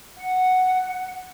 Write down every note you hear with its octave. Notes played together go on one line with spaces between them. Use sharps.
F#5